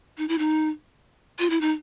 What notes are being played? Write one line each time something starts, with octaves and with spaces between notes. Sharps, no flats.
D#4
E4
D#4
F4
E4
D#4